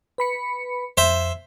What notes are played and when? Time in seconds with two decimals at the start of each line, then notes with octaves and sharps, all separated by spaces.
0.18 B4 B5 C#7
0.97 F2 C5 E5